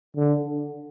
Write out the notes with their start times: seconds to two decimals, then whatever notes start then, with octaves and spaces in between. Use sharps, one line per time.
0.17 D3